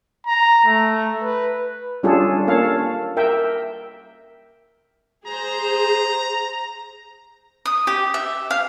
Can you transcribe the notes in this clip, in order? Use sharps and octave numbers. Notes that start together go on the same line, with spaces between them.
A#5
A3
B4
G3 C#4 D4 F4 G#4 A4
A#3 C#4 A4 C#5 F5
A#4 E5 G5
G#4 C5 A#5
D#6
G4
E5
F5